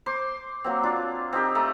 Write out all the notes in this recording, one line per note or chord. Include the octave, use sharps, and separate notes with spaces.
C5 C6 D6
F#3 A#3 C4
D4 F4
C4 D#4 G4 A#4
A3 A#5